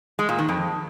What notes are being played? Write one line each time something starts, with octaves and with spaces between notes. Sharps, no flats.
G#3
A#2
D#3
F2